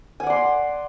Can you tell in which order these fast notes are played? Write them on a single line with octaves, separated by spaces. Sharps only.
G#5 F#5 D5 C6